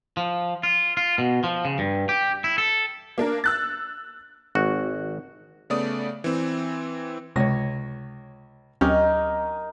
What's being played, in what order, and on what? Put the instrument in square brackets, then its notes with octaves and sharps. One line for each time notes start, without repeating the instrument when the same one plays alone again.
[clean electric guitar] F3
F4
F4
B2
F3
C#3
G2
G4
E4
A4
[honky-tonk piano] A#3 D4 A#4
E6 F#6 A6
[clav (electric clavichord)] G#1 F#4
[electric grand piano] C#3 A3 B3 D5 D#6
E3 C4
[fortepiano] C#2 C#5 [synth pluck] C3 A#6
[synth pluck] D2 F#3 C4 [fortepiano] C#4 G4 [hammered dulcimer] D#4 A#4